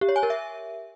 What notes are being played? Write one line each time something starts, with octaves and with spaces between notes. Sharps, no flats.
G4
C#5
G#5
A#4
E5